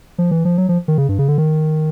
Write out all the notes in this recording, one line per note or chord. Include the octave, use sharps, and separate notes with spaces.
F3
E3
F3
F#3
F3
D#3
C#3
G2
C#3
D3
D#3